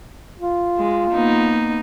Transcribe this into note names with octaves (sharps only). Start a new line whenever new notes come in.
F4
G#3
A#3 B3 D#4